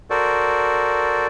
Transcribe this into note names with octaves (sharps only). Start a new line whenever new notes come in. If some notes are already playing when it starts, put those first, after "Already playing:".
F#4 A4 A#4 C5 D5